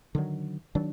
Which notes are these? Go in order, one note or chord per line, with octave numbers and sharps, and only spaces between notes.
D3 D#3 F#3
D#3 F#3 D4